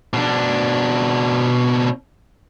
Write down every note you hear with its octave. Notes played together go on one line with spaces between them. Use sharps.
B2 D4